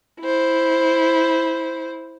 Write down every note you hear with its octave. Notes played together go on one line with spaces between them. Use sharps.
E4 C5